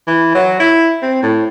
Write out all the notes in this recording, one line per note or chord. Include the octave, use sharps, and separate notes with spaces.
E3
F#3
E4
C4
A2